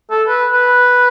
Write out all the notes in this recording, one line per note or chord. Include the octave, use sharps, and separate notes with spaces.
A4
B4
B4